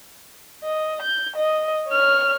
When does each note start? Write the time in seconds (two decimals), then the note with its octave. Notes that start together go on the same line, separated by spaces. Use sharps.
0.64 D#5
1.02 G6
1.36 D#5
1.89 C#5 F6